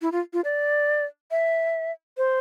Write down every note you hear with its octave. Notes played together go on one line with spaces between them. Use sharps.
E4
F4
F4
D5
E5
C5